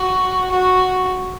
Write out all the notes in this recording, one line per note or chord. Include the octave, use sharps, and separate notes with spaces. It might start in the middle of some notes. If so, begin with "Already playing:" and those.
Already playing: F#4
F#4